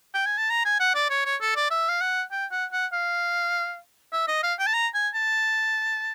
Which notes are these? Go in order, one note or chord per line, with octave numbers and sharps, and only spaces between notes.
G5
G#5
A5
A#5
G#5
F#5
D5
C#5
C#5
A4
D5
E5
F5
F#5
G5
F#5
F#5
F5
E5
D#5
F5
G5
A5
A#5
G#5
A5